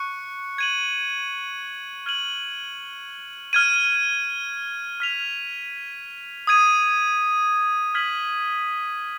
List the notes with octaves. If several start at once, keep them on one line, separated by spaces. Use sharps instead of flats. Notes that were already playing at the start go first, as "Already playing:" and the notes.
Already playing: C#6 F#6 C#7
G#6 D#7 F#7
F6 G#6 D#7 F#7
F6 G#6 D#7
F6 B6 F7
D#6 G#6 D#7
F6 G#6 B6 F#7